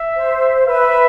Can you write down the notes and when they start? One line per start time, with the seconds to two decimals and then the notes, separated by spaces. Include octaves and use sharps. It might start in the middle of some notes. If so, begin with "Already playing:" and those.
Already playing: E5
0.16 C5
0.67 B4 E5